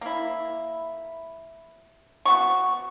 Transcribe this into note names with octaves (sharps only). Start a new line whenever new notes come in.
A#3 E4
B3 F#4 C#6